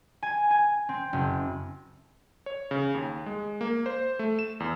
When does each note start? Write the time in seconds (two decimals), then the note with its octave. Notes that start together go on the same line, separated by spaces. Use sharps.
0.23 G#5
0.51 G#5
0.89 C4
1.13 F#1
2.46 C#5
2.71 C#3
2.94 D#2
3.26 G#3
3.61 A#3
3.86 C5
4.19 A3
4.39 E7
4.60 E2